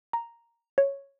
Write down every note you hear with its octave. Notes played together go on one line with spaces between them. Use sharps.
A#5
C#5